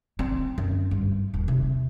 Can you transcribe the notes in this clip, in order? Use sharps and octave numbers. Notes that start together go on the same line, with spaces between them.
C4
F#2
G2
D#1
C3